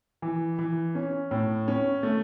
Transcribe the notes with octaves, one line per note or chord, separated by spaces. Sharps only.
E3
E3
C#4
A2
C#4
A3